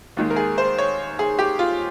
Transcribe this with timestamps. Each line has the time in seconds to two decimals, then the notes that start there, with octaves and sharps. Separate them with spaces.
0.17 D#2 D#3 G#3
0.30 A#4
0.36 G#4
0.58 C5
0.78 C#5
1.19 G#4
1.39 G4
1.59 F4